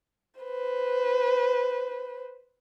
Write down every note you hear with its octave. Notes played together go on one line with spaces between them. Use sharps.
B4 C5